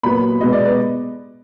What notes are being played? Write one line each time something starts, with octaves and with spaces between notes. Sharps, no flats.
A#2 F#3 B3 B5
B2 G#3 B3 D#5
D5
B4